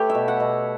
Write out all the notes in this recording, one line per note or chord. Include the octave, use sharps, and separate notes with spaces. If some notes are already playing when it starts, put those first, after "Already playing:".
Already playing: A3 G4 B4 C#5
E5
B2
F#5
B2